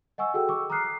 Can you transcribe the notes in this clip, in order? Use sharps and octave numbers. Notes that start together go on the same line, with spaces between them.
D#5 F#5 G#5 C#6 E6
F#4 G#4 A4 G5 E6
C#6 D6 E6
A#5 D6 D#6 F6 F#6 C7
C7